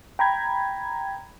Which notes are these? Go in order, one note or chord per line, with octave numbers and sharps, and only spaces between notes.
G5 A#5 B5 G#6